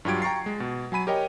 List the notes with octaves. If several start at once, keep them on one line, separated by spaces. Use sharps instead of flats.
G2 F#3 F4 G4 G#6 D7
G5 A#5 C#6 A6 C7
G#3
B2
F#3 G#5 B5 D#7
G4 A#4 C#5 D#5 G5